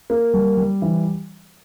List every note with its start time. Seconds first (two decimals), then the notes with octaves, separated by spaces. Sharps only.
0.10 A#3
0.34 G3
0.57 G3
0.82 E3